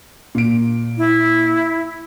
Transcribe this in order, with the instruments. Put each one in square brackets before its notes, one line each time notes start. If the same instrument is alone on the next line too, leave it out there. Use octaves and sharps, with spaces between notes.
[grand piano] A#2 D7
[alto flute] E4